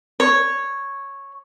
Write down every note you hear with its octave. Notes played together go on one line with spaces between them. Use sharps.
C#5